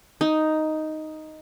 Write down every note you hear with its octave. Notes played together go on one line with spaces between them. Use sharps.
D#4